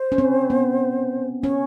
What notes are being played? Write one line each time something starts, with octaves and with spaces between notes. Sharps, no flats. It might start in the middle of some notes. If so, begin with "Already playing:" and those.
Already playing: C5
C#4
C4
B3
C#4 C#5